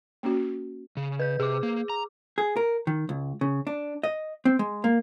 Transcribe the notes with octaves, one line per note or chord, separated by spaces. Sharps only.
A#3 C#4 F#4
C#3
B4 G6
C3 G#4 D6
A#3
A#5
G#4
A#4
D#3
C#2
C#3
D4
D#5
C4
G#3
A#3